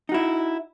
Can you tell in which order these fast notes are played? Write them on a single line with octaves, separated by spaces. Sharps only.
D#4 F#4 E4